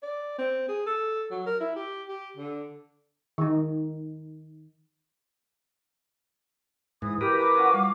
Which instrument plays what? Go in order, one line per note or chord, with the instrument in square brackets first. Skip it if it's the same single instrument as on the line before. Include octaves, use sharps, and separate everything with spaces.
[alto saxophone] D5
C4
G#4
A4
F#3
A#4
E4
G4
G4
D3
[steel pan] D#3 D#4
[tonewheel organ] G#2 [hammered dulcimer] E3 [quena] D#6
[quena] G4 [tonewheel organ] A#4 B4
[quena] D6
[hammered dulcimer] C#4 F4 F#4
[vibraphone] G3 [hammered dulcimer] F5